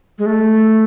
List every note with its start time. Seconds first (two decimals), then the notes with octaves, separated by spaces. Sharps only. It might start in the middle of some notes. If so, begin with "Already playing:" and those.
0.19 G#3
0.26 A3